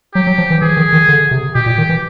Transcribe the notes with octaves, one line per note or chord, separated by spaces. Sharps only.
F#3 G4
F#3
F3
E3
E3 G#4
D#3
D#3
D3
C3
B2 G4
A#2
D#3
E3